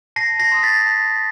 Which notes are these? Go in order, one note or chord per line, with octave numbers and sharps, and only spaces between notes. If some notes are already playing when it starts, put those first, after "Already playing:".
A5 A#6 C7
A#6 C7
C6 D#6
A6 B6
A5